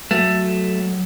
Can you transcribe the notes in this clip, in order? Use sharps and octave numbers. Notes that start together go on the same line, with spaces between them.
F#3 A3